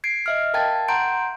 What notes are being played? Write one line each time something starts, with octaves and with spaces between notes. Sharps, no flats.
G#6 C7 D7
D#5 E5 F6
A#4 F5 G5 A5 G#6 A6
F#5 A#5 C6 G6 D7